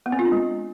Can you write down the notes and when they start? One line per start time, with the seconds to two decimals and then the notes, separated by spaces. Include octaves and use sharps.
0.06 B3
0.12 C4
0.19 F4
0.25 D4
0.32 G#3